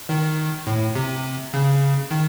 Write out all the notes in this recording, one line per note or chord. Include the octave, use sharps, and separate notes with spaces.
D#3
A2
C3
C#3
D#3